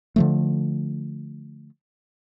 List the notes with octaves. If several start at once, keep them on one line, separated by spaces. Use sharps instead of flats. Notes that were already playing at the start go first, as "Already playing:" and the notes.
D3 F3 A3